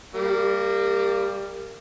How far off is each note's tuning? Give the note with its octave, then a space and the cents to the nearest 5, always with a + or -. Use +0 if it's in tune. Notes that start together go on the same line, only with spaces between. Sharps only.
G3 +20 A#3 -15